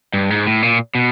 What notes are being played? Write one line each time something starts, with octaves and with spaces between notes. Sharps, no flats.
G2
G#2
A2
A#2
B2